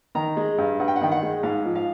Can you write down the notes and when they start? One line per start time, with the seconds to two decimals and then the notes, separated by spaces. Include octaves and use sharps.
0.15 D#3 A#5
0.37 G#3
0.58 G2
0.80 G2 F#5
0.88 G5
0.96 F#5
1.01 D#3 G5
1.12 F#5
1.23 G#3
1.43 G#2 F5
1.65 F3
1.75 F5